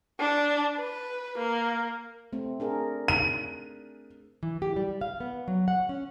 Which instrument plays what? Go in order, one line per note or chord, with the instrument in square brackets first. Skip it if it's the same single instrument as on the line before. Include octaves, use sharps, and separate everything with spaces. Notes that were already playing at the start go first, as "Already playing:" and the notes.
[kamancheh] D4
B4
A#3
[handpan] A3 C4
D4 G#4 A#4
[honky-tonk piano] D#7
[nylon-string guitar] E3
G4
G3
F5
B3
F#3
F#5
C#4